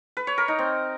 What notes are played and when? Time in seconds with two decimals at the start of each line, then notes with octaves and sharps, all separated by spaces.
0.17 B4
0.27 C#5
0.38 A#4
0.48 D#4
0.59 C4